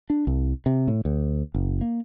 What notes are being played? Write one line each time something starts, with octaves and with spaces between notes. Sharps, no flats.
D4
C2
C3
A2
D2
F#1
A#3